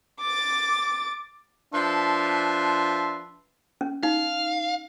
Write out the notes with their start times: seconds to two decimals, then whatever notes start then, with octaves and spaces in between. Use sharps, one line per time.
0.21 D6 A6
1.74 F3 D4 B4 E5 A5 C6
3.81 C#4
4.03 D#4 F5